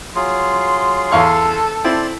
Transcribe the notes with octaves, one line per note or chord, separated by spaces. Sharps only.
F#3 F4 G#4 C6
E2 A4 F5 C#6
C4 E4 D5 C6